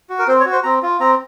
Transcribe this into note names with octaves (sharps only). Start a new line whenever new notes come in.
F#4
A#4
C4 C5
C#5
F#4
C5
C4 A#5
F4
C4 A#5